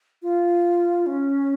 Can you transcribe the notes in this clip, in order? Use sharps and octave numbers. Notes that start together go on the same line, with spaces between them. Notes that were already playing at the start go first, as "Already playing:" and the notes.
F4
C#4